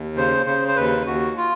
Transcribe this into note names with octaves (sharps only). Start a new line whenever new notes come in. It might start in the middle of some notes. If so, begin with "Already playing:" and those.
Already playing: D#2
C#3 C5
C#3 C5
C5
D#2 B4
D#2 F#4
F4